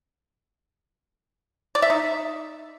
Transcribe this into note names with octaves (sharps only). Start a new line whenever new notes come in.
D5
E5
D#4